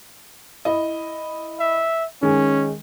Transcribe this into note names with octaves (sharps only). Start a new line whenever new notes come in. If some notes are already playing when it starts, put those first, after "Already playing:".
E4 D#5
E5
D#3 G#3 C#4